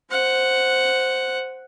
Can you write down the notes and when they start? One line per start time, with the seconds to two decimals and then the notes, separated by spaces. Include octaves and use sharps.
0.10 C5 F#5